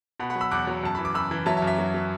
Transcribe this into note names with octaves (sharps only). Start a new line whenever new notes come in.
B2 F#5 B5
F#5 B5
F#3
B5 E6
E2 D6 F#6
F#3
F#2 A5
E3 B5
D6
F#2 B5 E6
E3
F#3 E5 A5
E5 A5
F#2
E5
F#3
F#3